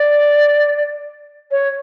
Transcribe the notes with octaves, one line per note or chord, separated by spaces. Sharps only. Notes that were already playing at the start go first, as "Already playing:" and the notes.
Already playing: D5
C#5